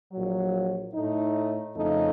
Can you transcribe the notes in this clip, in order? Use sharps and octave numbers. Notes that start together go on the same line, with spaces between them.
A#1 A#2 F#3
A2 A3 D#4
F2 C#3 A3 D#4 A4